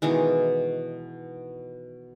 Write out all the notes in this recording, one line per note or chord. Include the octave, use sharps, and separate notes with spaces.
B2 D#3 E3 G#3